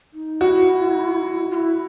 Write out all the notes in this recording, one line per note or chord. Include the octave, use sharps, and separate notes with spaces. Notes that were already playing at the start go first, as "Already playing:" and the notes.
D#4
E4 F#4
F4
E4